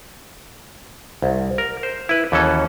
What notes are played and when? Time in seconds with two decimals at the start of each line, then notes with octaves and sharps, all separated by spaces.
1.22 C2
1.58 A#4
1.83 C5
2.09 E4 B4
2.32 D#2 E3 F#3 C#4 A4